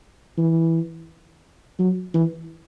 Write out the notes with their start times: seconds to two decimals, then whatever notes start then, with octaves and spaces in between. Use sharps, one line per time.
0.38 E3
1.79 F#3
2.14 E3